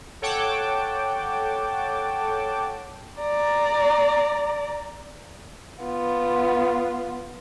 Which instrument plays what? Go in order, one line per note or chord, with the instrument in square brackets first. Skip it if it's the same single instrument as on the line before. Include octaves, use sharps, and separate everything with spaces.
[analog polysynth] A4 C#5 F#5 G5 A5 D6
[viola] D5 A#5
[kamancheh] B3 F4